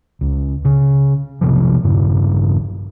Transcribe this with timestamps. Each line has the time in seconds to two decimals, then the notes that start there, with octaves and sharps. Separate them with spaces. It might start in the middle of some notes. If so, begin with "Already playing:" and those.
0.21 C#2
0.65 C#3
1.41 B1 C3 F3
1.84 E1 G2 C#3